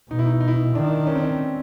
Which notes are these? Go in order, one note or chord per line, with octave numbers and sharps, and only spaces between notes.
B2 D#4
E4
D#4
E4
D#4
E4
D#4
D#3 D4
C#4
C4
C#4